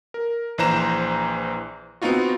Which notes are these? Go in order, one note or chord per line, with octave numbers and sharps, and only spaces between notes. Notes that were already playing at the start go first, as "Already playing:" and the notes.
A#4
A#1 E3 C5 A#5 E7
B3 C4 D#4 F4 F#4